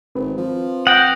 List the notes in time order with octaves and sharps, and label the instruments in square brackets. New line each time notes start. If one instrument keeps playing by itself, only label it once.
[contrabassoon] G#1 [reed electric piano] C4 B4
[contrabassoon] F3
[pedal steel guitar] F#5 G5 [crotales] D#6 G6 A#6